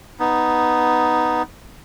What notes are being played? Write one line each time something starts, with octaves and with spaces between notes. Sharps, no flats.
B3 D#4